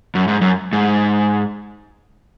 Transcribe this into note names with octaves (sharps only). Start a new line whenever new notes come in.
F#2
G#2
F#2
G#2